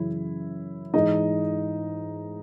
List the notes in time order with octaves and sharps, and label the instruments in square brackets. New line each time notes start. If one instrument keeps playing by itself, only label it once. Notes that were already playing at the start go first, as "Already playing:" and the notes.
Already playing: [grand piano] F#2 C#3 E3 E4
G#2 E3 G#3 D#4 D#5